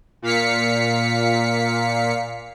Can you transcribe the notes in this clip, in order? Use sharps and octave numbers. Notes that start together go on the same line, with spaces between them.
A#2 F5 B6 C#7